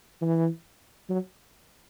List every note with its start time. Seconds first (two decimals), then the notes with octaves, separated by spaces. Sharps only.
0.22 E3
1.10 F#3